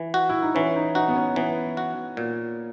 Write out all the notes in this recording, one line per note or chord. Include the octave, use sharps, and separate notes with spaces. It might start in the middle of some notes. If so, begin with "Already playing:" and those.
Already playing: E3
F#4
E4
D#4
E3 C#4
D#4
D#4 F#4
B3
C#4
E3 B3
F#4
A#2